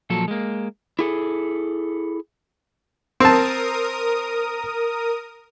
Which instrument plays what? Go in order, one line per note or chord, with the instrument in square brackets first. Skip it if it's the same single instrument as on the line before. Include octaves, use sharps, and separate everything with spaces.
[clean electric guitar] A#2 F3 F#3 A4
G#3 A#3
[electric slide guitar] E4 G#4 A4
[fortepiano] C4 A5 [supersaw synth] A#4 D#6